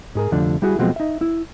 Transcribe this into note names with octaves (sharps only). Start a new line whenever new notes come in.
G#2 G#4 A#4
C2 F2 D3 F3 A3 D4
G3 E4 F#4 G#4
B2 F3 F#3 G#3 A3 C4
D#4 E5
E4